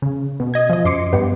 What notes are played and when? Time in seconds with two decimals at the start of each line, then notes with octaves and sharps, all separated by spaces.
0.02 C#3
0.40 B2
0.54 D#5 G#6
0.70 F3 D#5
0.85 F#2 C6 D6 C7 C#7
1.13 G2 B3 G4